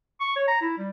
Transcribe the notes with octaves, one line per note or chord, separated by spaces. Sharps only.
C#6
C#5
A#5
E4
G3